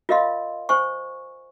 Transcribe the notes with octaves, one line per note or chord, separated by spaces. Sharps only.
F4 A#4 D#5 F5 C6
C5 G#5 C#6